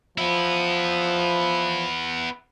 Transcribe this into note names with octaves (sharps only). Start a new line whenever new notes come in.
F3 B3 E4